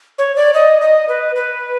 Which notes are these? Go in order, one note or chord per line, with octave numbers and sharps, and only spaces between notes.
C#5
D5
D#5
D#5
B4
B4